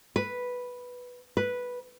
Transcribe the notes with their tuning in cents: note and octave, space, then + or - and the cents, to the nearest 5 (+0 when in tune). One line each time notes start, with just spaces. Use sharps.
B4 -5
B4 -5